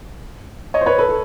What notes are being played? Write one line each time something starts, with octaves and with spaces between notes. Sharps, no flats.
C#5 D#5
C5
B4 C#5
A4 B4
A4